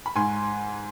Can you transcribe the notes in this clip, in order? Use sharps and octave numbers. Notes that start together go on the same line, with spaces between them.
B5
G#2 G#5 C6